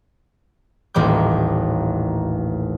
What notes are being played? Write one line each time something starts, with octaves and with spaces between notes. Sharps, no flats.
D#1 A1 D#2 G3 D6 G6